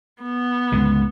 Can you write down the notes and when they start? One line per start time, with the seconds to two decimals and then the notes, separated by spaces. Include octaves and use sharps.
0.23 B3
0.72 C#2 G2 D3